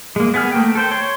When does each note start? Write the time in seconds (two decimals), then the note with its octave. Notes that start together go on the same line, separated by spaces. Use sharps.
0.16 G#3 A#3
0.34 B3 G#4 F6
0.52 A3 A#3 G5
0.75 A4 C5 G5
0.91 C#5 C6